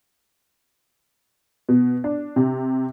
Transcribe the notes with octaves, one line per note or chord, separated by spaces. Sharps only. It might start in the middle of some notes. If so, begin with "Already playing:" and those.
B2
D4
C3